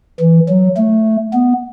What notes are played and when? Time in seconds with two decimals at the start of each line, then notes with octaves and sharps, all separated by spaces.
0.20 E3
0.49 F#3
0.77 A3
1.33 B3